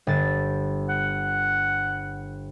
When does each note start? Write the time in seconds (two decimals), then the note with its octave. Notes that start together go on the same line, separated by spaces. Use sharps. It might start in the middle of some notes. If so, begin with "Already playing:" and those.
0.07 G1 A6
0.89 F#5